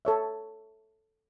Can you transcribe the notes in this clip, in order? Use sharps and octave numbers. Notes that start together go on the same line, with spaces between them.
A4 C#5 E5